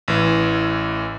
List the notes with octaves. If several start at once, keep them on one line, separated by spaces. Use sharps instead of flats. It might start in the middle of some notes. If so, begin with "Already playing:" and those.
A1 E3